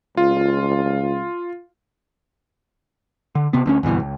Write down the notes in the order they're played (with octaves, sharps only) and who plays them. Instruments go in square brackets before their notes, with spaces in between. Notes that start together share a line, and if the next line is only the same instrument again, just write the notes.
[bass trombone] C#2 [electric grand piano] F4
[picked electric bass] D3
C3 B3
D2 A3 C#4
D2 G2 B2 E3
C#2